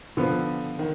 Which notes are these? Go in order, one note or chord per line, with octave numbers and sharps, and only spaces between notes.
D3 F3 B3
D#3